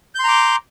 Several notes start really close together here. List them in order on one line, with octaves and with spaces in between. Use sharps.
G6 C6 A#5 D6